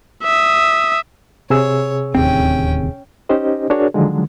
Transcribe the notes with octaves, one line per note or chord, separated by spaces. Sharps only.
E5 D#6
C3 G#4 C#5 E6
D1 D#2 C4 C#4 G5
C#4 D#4 G4 C5 D#5
D4 F#4 G#4 A#4 C#5 D5
D3 D#3 F3 F#3 G#3